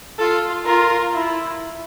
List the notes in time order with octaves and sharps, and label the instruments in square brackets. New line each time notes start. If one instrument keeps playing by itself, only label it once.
[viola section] F4 [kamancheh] A4
[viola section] F4 [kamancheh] A#4
[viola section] E4